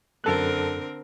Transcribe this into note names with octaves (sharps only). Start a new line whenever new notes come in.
F#2 D3 C4 A4 A#4 F#6